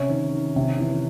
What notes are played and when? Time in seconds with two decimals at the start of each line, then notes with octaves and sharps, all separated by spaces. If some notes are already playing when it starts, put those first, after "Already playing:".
Already playing: C3 C#4
0.09 D#3
0.33 D#3
0.56 C3
0.79 E3